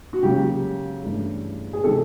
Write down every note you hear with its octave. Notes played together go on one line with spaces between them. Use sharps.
F#4
C#3 F#3 A#3 C#4 G4
G2 E3 A3 C#4
G#4
C3 D#3 G#3 A4